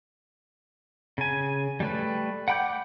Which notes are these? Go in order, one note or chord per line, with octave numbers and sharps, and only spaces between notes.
C#3 G#5
G3 A3 B4
F#5 G5 B5 D6 G6